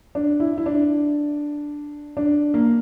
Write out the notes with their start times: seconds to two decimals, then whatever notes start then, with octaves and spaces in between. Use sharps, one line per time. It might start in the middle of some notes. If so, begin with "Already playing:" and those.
0.15 D4
0.40 E4
0.58 E4
0.66 D4
2.17 D4
2.54 A#3